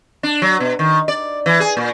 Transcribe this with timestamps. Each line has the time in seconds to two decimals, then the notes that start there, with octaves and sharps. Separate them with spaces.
0.23 D4
0.42 F#3
0.60 B2
0.79 D#3
1.08 D5
1.46 E3
1.60 G#4
1.77 A#2